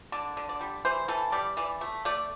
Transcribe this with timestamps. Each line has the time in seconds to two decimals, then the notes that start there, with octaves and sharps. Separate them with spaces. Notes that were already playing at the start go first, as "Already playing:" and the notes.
0.12 D3 D5
0.37 D3
0.49 D5
0.61 G3
0.85 E3 C5
1.08 E3 A4
1.32 G3 D5
1.57 E3 D5
1.81 A3
2.05 A3 D5